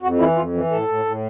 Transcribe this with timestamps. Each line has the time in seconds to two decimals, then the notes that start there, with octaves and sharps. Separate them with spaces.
0.02 F2 F#4
0.19 E3 E4
0.36 F2 F4
0.53 E3
0.71 A2 A4
0.88 A2
1.05 A2